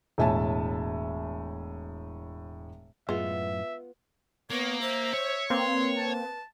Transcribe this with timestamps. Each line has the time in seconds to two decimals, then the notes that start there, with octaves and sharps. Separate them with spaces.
0.18 E1 A2 E5 G#5 A5
3.09 F#2 A2 G#3 B3 F4 E5
4.50 A#3 B3 C#5
4.81 C5 E5
5.14 C#5
5.50 A#3 C4 B4 C6
5.97 A5